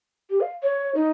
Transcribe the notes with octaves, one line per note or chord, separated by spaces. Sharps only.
G4
F5
C#5
D#4